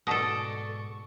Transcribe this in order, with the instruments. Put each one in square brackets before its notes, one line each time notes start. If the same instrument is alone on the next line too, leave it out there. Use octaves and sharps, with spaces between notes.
[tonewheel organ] G#2 C#6 [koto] B2 A4 [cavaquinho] D5 A5 D#6